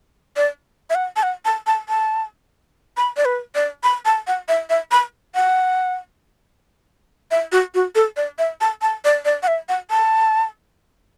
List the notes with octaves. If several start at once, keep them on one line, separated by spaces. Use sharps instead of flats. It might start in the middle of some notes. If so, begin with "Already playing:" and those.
D5
E5
F#5
A5
F#5
A5
A5
A5
B5
D5
B4
D5
B5
A5
F#5
E5
E5
B5
F#5
E5
F#4
F#4
A4
D5
E5
A5
A5
D5
D5
F#5
E5
F#5
A5